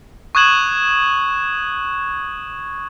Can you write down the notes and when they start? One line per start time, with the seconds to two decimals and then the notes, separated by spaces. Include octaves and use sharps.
0.35 C#6 D#6 F#6 G#6 E7 F#7